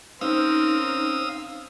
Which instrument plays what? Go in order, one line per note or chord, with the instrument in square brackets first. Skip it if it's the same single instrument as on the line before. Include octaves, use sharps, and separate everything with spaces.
[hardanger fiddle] C4 A#4 [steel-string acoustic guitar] C#4 C5 [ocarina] D#4 [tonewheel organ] F5 D#6 E6